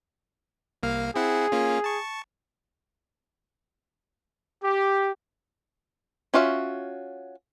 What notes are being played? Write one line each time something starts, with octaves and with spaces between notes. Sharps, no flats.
C2 A#3 F5
C4 E4 G#4 F#5
A#3 C#4 F4
A5 C#6
G4
C#4 F4 F#4 A#4 E5